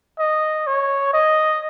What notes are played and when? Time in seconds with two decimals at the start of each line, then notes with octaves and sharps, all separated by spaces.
0.19 D#5
0.67 C#5
1.13 D#5